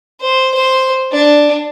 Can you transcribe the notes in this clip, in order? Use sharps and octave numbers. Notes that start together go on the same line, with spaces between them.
C5
C5
D4